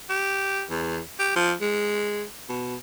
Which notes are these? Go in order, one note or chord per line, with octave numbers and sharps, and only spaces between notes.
G4
E2
G4
F3
G#3
B2